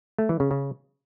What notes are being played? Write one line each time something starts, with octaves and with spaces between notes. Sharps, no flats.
A3
E3
C#3
C#3